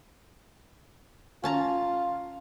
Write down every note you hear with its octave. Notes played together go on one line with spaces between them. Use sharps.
C#4 F4 A5 A#5